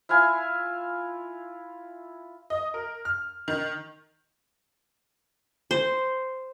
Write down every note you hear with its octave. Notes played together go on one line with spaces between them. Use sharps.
E4 F4 F5 G#5
D#5
A#4
F6
D#3
C5